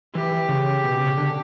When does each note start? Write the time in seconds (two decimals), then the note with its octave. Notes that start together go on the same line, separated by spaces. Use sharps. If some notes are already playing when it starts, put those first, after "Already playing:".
0.15 E3 G4
0.48 C#3
0.84 B2
1.00 C#3
1.18 D3